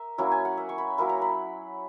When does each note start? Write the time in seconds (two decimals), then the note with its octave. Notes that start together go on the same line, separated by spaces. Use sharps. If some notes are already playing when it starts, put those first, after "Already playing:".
Already playing: A#4 E5
0.18 F#3 A#3 C#4 E4
0.31 G#5
0.45 F#5
0.57 E5
0.69 C#6
0.78 B5
0.98 F#3 A#3 E4 B5
1.09 A#5
1.22 B5